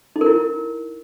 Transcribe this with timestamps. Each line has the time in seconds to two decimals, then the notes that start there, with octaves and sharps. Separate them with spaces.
0.16 D#4
0.21 A#4
0.26 E4